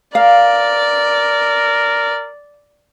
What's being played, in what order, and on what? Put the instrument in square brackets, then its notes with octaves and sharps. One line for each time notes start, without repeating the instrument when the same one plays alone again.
[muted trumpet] A#4 [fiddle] D5 [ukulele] F5